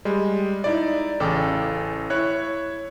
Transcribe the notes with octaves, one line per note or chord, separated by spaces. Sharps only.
G3 G#3
D#4 E4 D5
A1 C#3 A4 G5 G#5 D6
E4 C#5 F#6